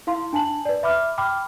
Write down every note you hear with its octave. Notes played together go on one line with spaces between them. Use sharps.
E4 F5 C6
D4 G#5 A5 F#7
B4 D5
E5 B5 D6 F6
G5 B5 D6 F6